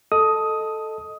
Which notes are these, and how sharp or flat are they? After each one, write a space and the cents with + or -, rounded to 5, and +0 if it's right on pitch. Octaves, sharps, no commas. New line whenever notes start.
A4 +0 D#5 +0 D#6 +10